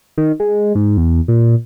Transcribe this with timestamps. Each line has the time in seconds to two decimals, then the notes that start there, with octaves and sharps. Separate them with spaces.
0.18 D#3
0.40 G#3
0.75 G#2
0.97 E2
1.28 A#2